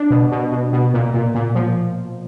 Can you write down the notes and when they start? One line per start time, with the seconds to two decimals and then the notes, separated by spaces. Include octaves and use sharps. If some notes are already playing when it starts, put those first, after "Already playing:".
Already playing: D4
0.10 B2
0.32 B2
0.52 B2
0.73 B2
0.94 A#2
1.14 A#2
1.35 A#2
1.55 F3